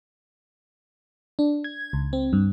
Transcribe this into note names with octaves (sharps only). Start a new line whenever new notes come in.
D4
G#6
C#2
C4
G2